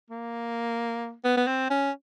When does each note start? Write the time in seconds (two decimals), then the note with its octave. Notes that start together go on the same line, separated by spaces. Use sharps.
0.10 A#3
1.25 B3
1.37 B3
1.47 C4
1.70 C#4